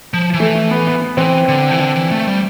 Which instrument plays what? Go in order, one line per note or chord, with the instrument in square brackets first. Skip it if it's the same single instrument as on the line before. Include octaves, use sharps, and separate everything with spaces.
[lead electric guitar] F3
E3
[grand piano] A3
A3
B3
B3
B3
[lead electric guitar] E3 [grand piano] C4
[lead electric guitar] D3
E3
D3
E3
A3
G3